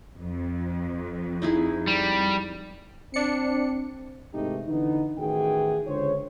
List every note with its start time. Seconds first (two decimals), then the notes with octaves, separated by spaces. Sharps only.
0.18 F2
1.42 D#4 E4 G#4
1.87 G3
3.14 C4 D4 C#7
4.34 G#2 C3 E3 A3 D#4 G4
4.68 D3 E3 B3 D#4
5.18 A1 D#3 E3 F#4 G#4 G5
5.87 C#2 D3 C5 C#5